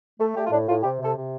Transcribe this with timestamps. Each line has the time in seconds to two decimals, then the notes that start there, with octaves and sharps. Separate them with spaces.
0.20 A3 A4
0.36 A3 G4
0.46 F4
0.52 A2 D4
0.68 A2 F4
0.83 C3 G4
1.00 C3 A4
1.15 C3